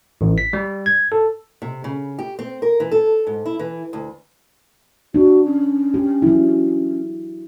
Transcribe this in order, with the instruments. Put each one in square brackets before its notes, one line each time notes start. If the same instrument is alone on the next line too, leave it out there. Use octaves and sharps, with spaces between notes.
[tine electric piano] A1
B6
G3
G#6
A4
[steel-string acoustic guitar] C3
C#3
G4
C4
A#4
E3
A4
G#2
E4
E3
D2
[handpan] D4 [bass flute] F#4
[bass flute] C#4
[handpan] G4
F#3 E4